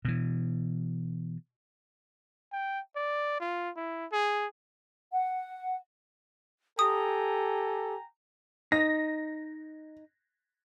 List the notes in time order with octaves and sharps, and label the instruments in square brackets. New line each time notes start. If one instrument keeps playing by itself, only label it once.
[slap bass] B2 E3
[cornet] G5
D5
F4
E4
G#4
[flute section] F#5
[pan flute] G4 [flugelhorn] A4 [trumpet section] G5 G#5 A#5 [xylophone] D#6
[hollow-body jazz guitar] D#4 [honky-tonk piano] A#6